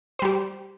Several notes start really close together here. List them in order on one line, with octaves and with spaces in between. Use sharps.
C5 G3 G4